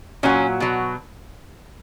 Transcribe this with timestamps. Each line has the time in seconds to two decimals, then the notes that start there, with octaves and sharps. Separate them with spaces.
0.23 A#2 F#3 C#4
0.60 B2 F#3